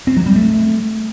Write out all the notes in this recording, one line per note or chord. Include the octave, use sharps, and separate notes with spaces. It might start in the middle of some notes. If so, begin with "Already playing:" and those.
C4
F#3
G3
A3